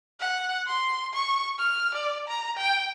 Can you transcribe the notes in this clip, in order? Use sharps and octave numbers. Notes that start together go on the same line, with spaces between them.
F#5
C6
C#6
F6
D5
A#5
G5